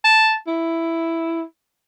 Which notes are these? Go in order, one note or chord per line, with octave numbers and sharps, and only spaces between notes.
A5
E4